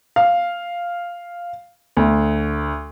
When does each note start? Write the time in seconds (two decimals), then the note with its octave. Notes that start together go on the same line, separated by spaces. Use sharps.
0.16 F5
1.97 D2